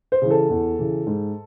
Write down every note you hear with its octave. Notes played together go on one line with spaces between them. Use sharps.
C5
C#3 E3
A4
E2
C#3 E3
G#2